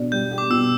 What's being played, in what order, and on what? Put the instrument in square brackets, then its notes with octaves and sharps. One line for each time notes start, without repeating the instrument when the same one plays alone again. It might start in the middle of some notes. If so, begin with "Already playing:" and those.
Already playing: [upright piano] B2 D4
[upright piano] G3 [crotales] G6
[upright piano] G4
[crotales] D6
[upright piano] B2 [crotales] E6